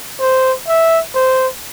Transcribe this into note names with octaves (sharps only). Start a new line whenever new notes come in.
C5
E5
C5